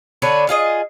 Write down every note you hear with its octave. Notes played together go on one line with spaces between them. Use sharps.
D3 D4 B4 C#5
F4 G#4 D#5